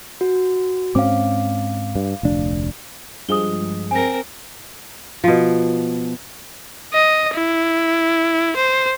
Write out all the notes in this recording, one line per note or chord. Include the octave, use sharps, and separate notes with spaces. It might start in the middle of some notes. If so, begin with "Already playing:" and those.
F#4
G#2 C4 C#4 F5 D6
G2
F1 D2 D4
G2 F3 G#3 D#6 G7
C4 A#4 G#5 A#6
B2 F3
D#5
E4
C5